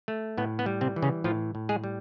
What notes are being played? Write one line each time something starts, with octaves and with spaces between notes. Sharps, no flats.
A3
A2 B3
B3
G3
C3 C4
E3
C#3 C#4
A2 F3 F4
A2
G#3 G#4
G3